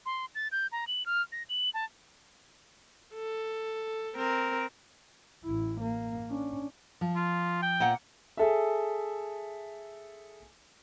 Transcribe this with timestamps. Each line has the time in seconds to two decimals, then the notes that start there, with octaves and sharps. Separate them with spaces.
0.06 C6
0.35 A6
0.52 G6
0.72 A#5
0.87 F#7
1.06 F6
1.32 A#6
1.49 F#7
1.74 A5
3.14 A4
4.16 C4 A#4
5.44 A1 E4
5.81 A#3
6.30 C#4 D4
7.01 F3
7.16 F4
7.62 G5
7.80 A#2 B3 F#5
8.37 G#4 A4 E5